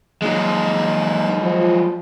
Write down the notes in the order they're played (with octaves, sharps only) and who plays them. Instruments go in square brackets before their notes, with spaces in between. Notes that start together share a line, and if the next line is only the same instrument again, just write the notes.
[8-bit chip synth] F3 A#3 D#4 [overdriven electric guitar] F#3 G#3
[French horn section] F3